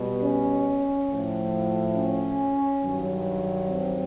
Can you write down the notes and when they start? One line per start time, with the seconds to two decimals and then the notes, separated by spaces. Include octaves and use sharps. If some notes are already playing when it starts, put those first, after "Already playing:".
Already playing: B2 G3
0.22 C#4
1.09 A2 F3
1.96 C#4
2.82 G2 D#3 F#3
3.69 C4